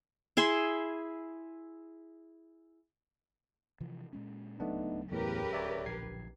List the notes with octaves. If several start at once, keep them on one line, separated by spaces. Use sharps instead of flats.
E4 G#4 E5 C6
C3 E3 F3
A#2 G#3 C#4
D1 C#2 F#3 A3 B3 D4 D#4
E2 A2 C#3 G4 A#4 B4
C#5 D5 E5
A#1 G#6 C7